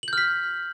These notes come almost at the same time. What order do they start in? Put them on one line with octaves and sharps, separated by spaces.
F#7 G6 F6 B6